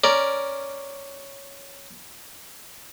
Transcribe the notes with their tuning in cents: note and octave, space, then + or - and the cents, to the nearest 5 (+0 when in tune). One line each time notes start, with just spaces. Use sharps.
C#4 +0 A#4 +0 D5 +0